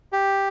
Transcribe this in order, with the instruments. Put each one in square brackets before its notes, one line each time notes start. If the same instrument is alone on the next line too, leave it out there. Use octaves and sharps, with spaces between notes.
[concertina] G4